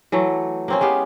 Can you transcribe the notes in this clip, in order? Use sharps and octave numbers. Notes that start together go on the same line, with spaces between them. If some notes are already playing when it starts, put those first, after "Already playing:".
E3 F#3 A3
A#3 C4 C#4
G#3 B3 G4 F5